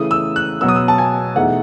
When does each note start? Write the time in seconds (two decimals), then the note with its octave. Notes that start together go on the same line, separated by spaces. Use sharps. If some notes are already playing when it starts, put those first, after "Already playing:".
Already playing: C#3 E3 A3 D#6
0.11 E6
0.36 F#6
0.61 B2 F#3 B3 E6
0.68 D#6
0.76 E6
0.88 A5
0.98 G#5
1.35 E2 B2 A3 D#4 F#5